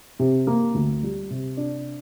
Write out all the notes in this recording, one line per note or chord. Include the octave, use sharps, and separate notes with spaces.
C3
A#3
D2
G3
C3
D4